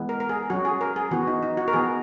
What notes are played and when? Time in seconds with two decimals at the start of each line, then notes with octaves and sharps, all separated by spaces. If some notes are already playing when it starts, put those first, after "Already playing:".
Already playing: E3 G#3 B3
0.09 A#4
0.20 A#4
0.29 G#4
0.50 F#3 C#4 F#4
0.65 G#4
0.81 A#4
0.96 G#4
1.11 E3 B3 F#4
1.27 D#4
1.43 D#4
1.57 F#4
1.68 A#4
1.73 E3 B3 G#4